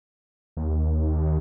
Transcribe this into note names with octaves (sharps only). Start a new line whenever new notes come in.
D#2